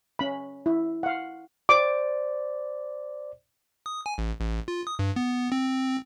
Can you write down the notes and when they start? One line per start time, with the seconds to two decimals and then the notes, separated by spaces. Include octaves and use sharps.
0.19 C#4 B5
0.66 E4
1.03 F5 F#5
1.69 C5 D5 D6
3.86 D#6
4.06 G#5
4.18 A1
4.40 A1
4.68 F4
4.87 D#6
4.99 G2
5.16 B3
5.52 C4